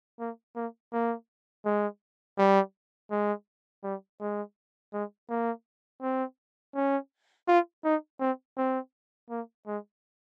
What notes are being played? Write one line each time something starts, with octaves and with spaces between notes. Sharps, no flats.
A#3
A#3
A#3
G#3
G3
G#3
G3
G#3
G#3
A#3
C4
C#4
F4
D#4
C4
C4
A#3
G#3